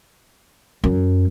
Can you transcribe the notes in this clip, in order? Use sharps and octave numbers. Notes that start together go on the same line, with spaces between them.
F#2